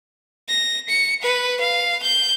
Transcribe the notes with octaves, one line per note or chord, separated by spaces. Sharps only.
A#6
C#7
B4
F5
G6